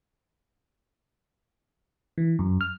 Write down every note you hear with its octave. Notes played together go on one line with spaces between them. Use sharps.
E3
F#2
F6